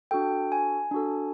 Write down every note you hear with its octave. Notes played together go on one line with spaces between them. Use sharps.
D4 F#4 A4 G5
G#5
D4 F#4 A4